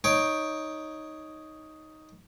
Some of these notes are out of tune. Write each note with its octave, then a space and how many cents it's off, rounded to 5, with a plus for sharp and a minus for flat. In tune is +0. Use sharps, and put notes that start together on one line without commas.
D#4 +5 C#5 +0 G5 +0